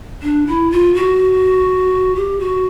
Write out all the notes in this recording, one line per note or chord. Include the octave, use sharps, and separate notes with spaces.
D4
E4
F4
F#4
G4
F#4